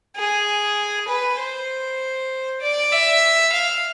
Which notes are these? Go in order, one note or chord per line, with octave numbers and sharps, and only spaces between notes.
G#4
B4
C5
D5
E5
F5